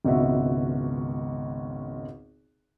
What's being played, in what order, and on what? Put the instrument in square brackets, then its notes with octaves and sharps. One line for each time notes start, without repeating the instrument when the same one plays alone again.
[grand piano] G#1 C#2 B2 F#4 E5